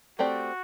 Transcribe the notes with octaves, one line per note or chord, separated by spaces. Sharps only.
A3 C4 F#4 G4 D5